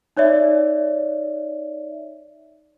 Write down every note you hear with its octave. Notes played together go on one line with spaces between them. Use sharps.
D#4 C#5 D5 E5